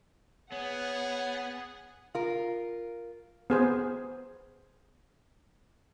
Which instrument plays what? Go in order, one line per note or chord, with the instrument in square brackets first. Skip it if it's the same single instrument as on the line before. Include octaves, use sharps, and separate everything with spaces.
[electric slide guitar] B3 [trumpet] G#4 [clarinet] C#5 [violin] F#5
[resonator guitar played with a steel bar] F4 A#4
[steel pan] B3 G#4 C5